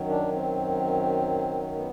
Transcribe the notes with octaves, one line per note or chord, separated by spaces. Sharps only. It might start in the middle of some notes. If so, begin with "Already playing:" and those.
Already playing: F#2 D#3 F#3
D4
C4
B3